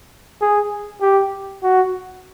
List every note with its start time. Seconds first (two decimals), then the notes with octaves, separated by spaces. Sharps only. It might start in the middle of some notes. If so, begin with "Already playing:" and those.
0.42 G#4
1.02 G4
1.63 F#4